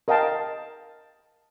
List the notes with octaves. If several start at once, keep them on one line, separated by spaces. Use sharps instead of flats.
A#4 D#5 F5 G5 A5